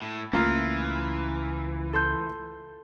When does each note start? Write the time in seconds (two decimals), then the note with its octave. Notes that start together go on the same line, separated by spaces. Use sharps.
0.02 A2
0.33 C#2 E3 A3 A#3 C#4 F4
1.93 A4 C6 G6